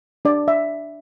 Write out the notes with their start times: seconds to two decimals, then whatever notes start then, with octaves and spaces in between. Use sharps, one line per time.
0.25 D4 D5
0.48 E5